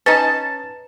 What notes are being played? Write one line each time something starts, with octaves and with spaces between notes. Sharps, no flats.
C#4 D#4 B4 A5 A6